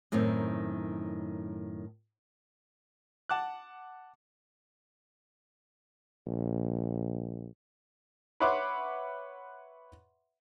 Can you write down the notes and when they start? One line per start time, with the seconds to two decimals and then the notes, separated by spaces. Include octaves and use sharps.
0.12 F#2 A2 D#3 C4 D#4
3.29 F#5 A5 D6 F#6
6.27 A#1
8.40 B4 C#5 E5 F#5 C6 D6